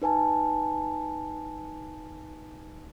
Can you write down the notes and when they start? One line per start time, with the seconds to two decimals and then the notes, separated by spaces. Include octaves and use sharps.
0.02 D#4 B4 G#5 A5